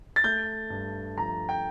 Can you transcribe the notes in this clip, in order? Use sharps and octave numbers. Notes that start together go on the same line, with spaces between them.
A6
A3 G6
G2
F3 A#5
G5